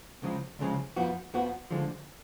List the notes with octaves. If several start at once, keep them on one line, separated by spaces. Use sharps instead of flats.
C#2 C#3 F3 G#3
C#2 C#3 F3 G#3
F2 F3 B3 F#4
F2 F3 B3 F#4
D2 D3 F3 G#3